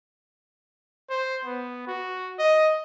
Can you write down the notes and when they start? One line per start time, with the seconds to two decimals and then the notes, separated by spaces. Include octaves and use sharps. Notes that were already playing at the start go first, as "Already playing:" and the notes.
1.10 C5
1.45 B3
1.87 F#4
2.39 D#5